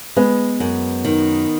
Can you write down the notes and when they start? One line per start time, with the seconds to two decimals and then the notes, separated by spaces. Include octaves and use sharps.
0.17 G#3 B3 B4
0.60 F#2
1.05 D#3